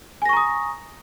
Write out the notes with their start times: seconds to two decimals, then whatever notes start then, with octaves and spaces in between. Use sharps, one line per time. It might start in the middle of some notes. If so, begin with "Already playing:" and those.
0.22 G#5
0.25 A#6
0.29 C#6
0.33 A#5
0.37 D#6